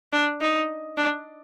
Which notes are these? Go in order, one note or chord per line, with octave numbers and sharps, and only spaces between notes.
D4
D#4
D4